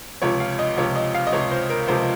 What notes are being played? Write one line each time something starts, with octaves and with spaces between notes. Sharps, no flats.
C#2 C3 F3 C#5
F5
D#5
C#2 C3 F3 C#5
D#5
F5
D#5
C#2 C3 F3 C#5
C5
A#4
C#2 C3 F3 C5